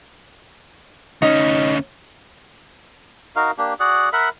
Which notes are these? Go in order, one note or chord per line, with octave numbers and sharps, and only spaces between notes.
D2 C#4 D#4
D#4 F#4 A#4 F5
A#3 D4 G4
F#4 G#4 D5 F#5
A#4 E5 F#5 B5